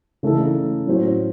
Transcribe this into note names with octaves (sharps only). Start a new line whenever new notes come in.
C#3 E3 A3 D#4 A4
A2 F#3 C#4 F#4 C5